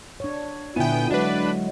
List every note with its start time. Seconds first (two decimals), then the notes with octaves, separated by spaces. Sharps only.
0.20 D4 C#5
0.76 A#2 D3 B3 E4 G5 G#5
1.11 F#3 G#3 D4 F#4 B4